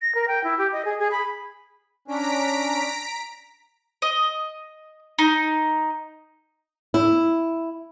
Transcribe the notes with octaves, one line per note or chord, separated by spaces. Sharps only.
A#6
A#4
G5
E4
G4
D#5
G#4
G#4
B5
C#4 D4 A#5 B6 D7
D#5
D#4
E4